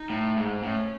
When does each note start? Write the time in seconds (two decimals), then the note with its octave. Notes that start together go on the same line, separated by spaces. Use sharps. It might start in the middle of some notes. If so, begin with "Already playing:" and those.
Already playing: D#4
0.10 A2
0.36 G#2
0.63 A2 C#4